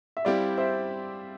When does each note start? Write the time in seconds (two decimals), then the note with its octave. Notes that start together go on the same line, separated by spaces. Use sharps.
0.17 E5
0.25 G3 C4 E4 G4 D5 F5
0.58 C5 E5